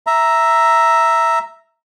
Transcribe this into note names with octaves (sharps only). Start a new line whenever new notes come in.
E5 A#5